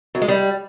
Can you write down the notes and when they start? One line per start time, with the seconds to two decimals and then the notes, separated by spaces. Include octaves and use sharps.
0.15 F#2
0.22 G#3
0.28 G3